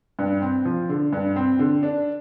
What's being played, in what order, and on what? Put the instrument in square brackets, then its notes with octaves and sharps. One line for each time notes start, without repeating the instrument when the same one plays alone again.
[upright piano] G2
C4
F3
D3
G2
C4
D3
D4